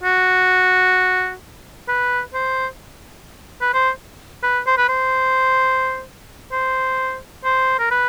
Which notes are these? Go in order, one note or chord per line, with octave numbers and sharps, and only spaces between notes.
F#4
B4
C5
B4
C5
B4
C5
B4
C5
C5
C5
A#4
B4